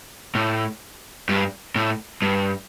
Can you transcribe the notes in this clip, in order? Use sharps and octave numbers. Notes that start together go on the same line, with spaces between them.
A2
G2
A2
G2